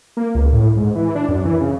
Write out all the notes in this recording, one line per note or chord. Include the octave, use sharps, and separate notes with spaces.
A#3
C#2
A2
G#2
E3
D4
F#2
E3
C#3